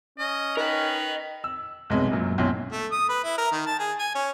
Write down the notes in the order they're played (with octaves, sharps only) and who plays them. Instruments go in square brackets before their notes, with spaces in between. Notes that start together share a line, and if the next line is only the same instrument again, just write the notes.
[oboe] C#4 [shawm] D#5
[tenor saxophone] D#4 [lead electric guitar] A#4 D#5 [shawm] B4
[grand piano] E6
B1 G#2 C3 G#3 B3
F#2 A#2 F#3
B1 C4 C#4 E4
[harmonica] A3
D#6
B4
E4
A#4
D#3
A5
G#4
G#5
C#4